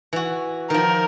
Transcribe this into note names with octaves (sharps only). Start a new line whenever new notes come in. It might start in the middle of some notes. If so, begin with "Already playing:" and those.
E3 F#4
D#3 F3 A#4